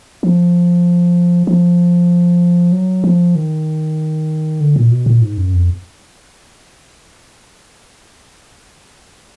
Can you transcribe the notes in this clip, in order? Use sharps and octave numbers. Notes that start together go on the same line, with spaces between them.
F3
F3
F#3
F3
D#3
D3
A#2
B2
A#2
G#2
F#2
F2